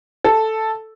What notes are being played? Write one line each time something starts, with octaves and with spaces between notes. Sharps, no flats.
A4